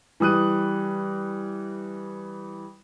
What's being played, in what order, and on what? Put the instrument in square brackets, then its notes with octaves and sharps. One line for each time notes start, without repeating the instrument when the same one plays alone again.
[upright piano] E3 G3 D#6 F#6 D#7